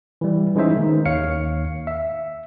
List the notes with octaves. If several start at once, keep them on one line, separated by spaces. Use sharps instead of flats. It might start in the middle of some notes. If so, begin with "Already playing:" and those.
E3 G3
E3 G#3 C#4 D#4 C5 E5
D#3 A#3
D#2 C#5 F5 C#7
E5